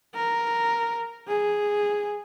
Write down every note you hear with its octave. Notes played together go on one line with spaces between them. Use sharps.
A#4
G#4